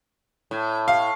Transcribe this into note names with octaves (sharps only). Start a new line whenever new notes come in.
A2
F5